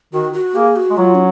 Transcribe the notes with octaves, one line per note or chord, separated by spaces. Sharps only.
D#3 F#4
F#4
A#3 G#4
F#4
G#3
F#3 F4
C#4